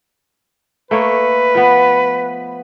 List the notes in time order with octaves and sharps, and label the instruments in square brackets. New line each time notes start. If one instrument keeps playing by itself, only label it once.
[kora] A3 A#3 C#5 [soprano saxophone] B4
[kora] F3 B3